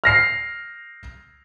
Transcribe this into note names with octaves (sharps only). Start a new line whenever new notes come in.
F6 A#6 C7